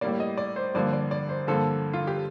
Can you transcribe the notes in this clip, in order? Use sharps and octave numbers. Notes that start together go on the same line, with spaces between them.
A2 G3 A#3 D5
D#5
D5
C5
G2 D3 F3 A#3 D5
D5
D5
C5
G2 D3 F3 A#3 A4
F4
G4